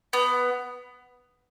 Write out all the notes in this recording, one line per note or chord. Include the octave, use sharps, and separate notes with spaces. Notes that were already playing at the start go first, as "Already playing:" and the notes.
B3